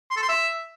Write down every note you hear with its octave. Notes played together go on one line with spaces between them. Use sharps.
C6
A4
C6
E5